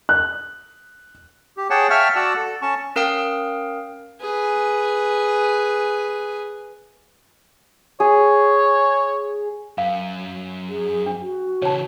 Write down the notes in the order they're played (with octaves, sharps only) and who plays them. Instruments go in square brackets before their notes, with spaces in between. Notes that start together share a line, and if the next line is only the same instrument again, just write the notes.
[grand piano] F#6
[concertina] G4
G#4 C#5 F#5 G5 A5
E5 F5 G5 A5 C#6 F6
F#4 D5 F#5 A5 E6
A4
C#4 A5 C#6
[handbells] C#4 A#4 F5 G5 D#6
[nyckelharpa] G#4 B4
[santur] G#4 [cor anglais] C#5
[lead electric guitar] F#2 [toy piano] F5
[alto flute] G#4
[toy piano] D4
[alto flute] F#4
[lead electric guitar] C#3 E3 [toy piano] C#5 A5